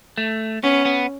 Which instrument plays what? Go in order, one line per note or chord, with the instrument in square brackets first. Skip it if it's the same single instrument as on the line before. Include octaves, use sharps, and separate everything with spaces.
[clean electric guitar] A3
[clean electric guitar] B3 [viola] C#4
[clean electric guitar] B3